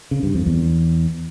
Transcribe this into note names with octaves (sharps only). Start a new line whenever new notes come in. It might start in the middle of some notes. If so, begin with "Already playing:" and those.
C#3
G2
F2
E2